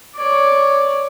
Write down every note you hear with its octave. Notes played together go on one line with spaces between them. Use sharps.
C#5 D5